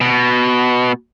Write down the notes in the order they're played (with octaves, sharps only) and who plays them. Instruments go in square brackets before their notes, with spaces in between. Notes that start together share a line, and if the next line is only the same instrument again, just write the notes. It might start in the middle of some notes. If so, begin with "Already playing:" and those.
[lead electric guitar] B2